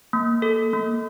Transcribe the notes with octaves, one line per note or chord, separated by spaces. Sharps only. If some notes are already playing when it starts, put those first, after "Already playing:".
A#3
A4
A#3